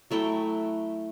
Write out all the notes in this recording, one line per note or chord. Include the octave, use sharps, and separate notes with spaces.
F#3 A3 E4 G5